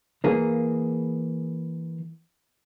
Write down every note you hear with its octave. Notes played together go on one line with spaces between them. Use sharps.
E3 A#3 G#4